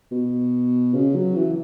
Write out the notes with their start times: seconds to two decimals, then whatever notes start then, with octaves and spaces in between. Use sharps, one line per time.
0.12 B2
0.94 C#3
1.15 F#3
1.36 E3